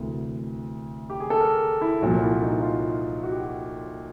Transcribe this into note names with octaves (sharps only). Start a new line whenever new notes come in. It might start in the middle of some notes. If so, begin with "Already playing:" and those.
Already playing: D2 C3 E3 A#4
G4
G#4
A4
A#4
E4
C2 A#2 F3 F#4
E4
D#4
F4
F#4
G4
F#4